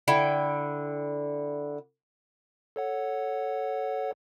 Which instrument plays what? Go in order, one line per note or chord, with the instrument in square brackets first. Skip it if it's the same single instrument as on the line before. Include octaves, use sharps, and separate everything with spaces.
[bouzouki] D3 E4 G5
[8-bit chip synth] A4 C#5 F#5